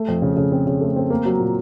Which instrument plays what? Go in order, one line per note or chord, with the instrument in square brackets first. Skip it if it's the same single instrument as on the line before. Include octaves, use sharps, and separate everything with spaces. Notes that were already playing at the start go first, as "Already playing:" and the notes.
Already playing: [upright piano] A3
F2
C#3
C#3
C4
C#3
A3
C4
A#3
F#3
A#2